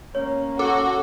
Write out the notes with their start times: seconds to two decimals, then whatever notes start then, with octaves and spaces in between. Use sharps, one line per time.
0.15 A#3 C#4 C#5
0.59 F#4 A4 D6